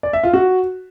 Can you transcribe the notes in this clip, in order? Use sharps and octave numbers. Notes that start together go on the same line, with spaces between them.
D5
E5
F4
F#4